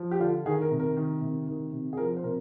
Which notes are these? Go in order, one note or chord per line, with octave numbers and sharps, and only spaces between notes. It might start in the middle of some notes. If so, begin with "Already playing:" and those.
Already playing: F3
G4
D3 F4
D#3 G#4
A#4
C3
A#4
D#3
C3
D#3
C3
G#4
F3 A#4
C5
C3 A#4